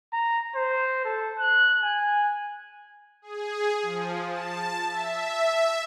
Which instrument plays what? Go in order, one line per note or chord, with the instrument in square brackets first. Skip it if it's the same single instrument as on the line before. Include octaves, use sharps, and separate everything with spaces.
[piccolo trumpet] A#5
C5
A4
F#6
G#5
[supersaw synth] G#4
F3
A5
E5